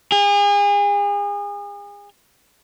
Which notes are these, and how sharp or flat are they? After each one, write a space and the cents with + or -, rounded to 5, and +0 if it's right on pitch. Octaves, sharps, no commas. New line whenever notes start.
G#4 -35